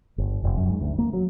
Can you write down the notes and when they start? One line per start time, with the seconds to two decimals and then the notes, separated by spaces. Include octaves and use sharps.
0.18 G1
0.44 F1
0.57 F#2
0.69 G#2
0.81 D2
0.98 A#3
1.13 F#3